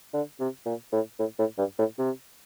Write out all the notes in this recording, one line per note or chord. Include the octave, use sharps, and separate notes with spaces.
D3
C3
A#2
A2
A2
A2
G2
A2
C3